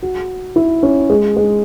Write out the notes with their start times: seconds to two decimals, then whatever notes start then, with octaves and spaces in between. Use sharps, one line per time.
0.03 F#4
0.56 E4
0.83 C#4
1.10 G#3
1.36 G#3